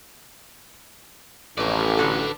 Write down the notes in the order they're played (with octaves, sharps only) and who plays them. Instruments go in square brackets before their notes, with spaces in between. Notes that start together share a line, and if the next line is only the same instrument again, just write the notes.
[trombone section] A1 [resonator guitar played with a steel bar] F2 A2 [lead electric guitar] B4 D5
[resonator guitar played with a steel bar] D3 F#4 A4